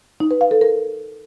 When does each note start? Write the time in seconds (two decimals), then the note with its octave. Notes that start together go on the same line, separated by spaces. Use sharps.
0.20 D#4
0.31 B4
0.41 F5
0.51 A4
0.61 A#4